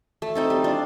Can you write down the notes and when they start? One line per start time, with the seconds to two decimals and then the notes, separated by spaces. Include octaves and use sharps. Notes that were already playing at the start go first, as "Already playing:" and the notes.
0.22 A3
0.35 C4 D#4 A4
0.50 G3
0.64 D4 F4